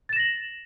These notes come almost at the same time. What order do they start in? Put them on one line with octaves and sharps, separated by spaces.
A6 E7 A#6 F#7